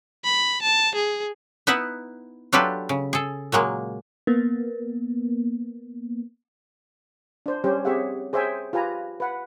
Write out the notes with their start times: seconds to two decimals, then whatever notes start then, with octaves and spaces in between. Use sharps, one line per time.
0.25 B5
0.62 A5
0.95 G#4
1.67 B3 D#4 E4 B4 E5 F#5
2.53 F#3 D4 F4 G4 A4 B4
2.89 C#3
3.13 G#4 A4
3.52 A#2 F#3 G#3 A#3
4.27 A#3 B3
7.46 D4 C5
7.64 G3 C#4 G4 C5
7.85 C4 G4 G#4 C#5 E5 F#5
8.33 G#4 C5 C#5 E5 G5 G#5
8.73 F4 G4 B4 G#5 A#5
9.20 B4 F#5